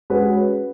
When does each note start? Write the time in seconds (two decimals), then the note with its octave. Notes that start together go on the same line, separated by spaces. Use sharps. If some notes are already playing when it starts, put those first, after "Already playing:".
0.10 G#3 C#4 F#4 B4